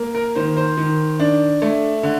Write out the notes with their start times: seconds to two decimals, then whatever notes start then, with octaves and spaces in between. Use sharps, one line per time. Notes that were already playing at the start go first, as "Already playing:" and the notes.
Already playing: A#3
0.15 A#4
0.35 D#3 C5
0.57 C5
0.77 D#3
1.20 D4
1.62 A3
2.03 D3